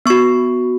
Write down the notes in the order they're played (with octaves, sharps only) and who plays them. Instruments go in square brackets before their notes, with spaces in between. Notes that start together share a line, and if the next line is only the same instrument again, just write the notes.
[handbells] B3 F#4 C#6